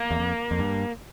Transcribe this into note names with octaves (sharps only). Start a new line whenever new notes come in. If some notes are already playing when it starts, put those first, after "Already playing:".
Already playing: A#3
E2
F2
F2
G2